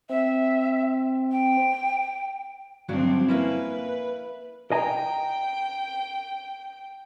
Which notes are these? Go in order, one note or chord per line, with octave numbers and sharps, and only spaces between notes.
C4 E5
G5
D2 G2 F3 F#3 C4 D4
A#3 C#4 E4 B4
D#5 G5 G#5 A#5